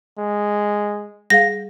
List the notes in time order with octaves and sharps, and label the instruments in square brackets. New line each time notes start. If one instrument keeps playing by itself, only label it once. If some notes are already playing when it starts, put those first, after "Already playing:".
[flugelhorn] G#3
[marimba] G3 G#4 F5 [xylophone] A#6